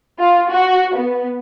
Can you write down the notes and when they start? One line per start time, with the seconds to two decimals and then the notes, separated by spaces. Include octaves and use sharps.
0.19 F4
0.49 F#4
0.96 B3